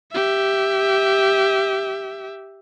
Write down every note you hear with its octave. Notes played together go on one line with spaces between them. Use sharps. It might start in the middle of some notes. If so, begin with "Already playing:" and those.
G4 E5